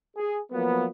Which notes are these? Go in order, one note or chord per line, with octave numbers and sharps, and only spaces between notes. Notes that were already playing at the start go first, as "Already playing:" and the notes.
G#4
F3 F#3 A#3 B3